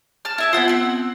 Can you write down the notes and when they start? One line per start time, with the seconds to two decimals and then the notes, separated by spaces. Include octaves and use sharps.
0.25 A5 F6
0.38 E4 E5 A5
0.53 B3 F4 C5 F#5 B5
0.68 C4 F#5